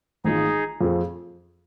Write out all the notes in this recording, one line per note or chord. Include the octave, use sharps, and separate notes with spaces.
G#1 G#2 G#3 D#4 F4 G#4
F2 F3 C4 F4 G#4